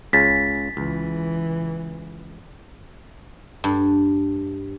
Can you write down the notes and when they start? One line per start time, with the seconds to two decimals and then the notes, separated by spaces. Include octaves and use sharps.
0.13 C#2 C#3 A6 B6
0.77 C#2 E3
3.64 G2